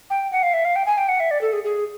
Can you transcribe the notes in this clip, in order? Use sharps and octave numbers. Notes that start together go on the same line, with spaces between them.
G5
F#5
F5
E5
F5
G5
G#5
G5
F#5
E5
D5
A4
G#4
G#4